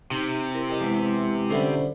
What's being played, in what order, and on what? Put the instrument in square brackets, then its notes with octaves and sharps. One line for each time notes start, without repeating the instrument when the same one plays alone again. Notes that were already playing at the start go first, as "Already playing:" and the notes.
[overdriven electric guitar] C3 [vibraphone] D#4
[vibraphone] E4 A#4
[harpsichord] G4 D#5
[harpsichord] E2 [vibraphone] G#3 E4 B4
[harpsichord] D3 G3 E4 [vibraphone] C#4 C5